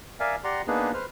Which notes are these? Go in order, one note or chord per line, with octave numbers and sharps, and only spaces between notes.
A#4 D5 E5 F5 G#5
G4 D5 F#5 A#5 C6
A#3 B3 D4 D#4 G#4 B4
B4 C5 F6